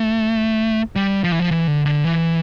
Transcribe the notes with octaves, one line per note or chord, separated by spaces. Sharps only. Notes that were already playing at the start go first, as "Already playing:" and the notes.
Already playing: A3
G3
F3
E3
F3
E3
D3
D3
E3